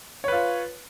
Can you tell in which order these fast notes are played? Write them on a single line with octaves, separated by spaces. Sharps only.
C#5 B4 F4